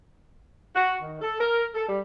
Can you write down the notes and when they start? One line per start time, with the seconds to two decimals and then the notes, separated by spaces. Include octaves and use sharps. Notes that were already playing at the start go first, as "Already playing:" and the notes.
0.75 F#4
1.02 D#3
1.22 A4
1.40 A#4
1.75 A4
1.88 G3